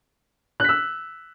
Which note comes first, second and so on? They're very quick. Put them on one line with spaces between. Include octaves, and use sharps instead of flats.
F#6 B6 E6